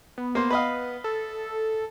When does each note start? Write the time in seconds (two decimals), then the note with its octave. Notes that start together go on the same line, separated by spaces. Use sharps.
0.18 B3
0.35 A#3 C5
0.51 B4 D#5 F5
1.04 A4